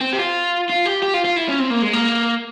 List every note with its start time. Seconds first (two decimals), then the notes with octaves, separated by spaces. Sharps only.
0.01 C4
0.13 G4
0.19 F4
0.70 F4
0.85 G4
1.03 G4
1.14 F4
1.25 F4
1.36 E4
1.48 C#4
1.59 C4
1.70 A#3
1.82 G#3
1.93 A#3